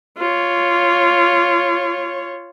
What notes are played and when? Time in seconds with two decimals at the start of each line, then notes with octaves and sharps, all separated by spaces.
0.18 F4 C#5